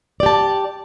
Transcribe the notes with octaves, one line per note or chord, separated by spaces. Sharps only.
G4 D5 A5